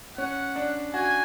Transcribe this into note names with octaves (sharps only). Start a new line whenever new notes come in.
C#4 F#5
D4
F#4 G#5